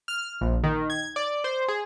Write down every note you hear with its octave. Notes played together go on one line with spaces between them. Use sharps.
F6
A#1
D#3
G#6
D5
C5
G#4